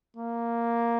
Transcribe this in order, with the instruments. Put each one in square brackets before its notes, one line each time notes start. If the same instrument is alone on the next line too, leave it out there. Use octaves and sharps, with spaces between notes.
[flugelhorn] A#3